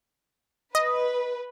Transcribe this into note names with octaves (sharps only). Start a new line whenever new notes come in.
B4 D#5